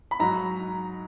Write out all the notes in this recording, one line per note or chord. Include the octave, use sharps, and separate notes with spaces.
B5
G#2 F#3 A#5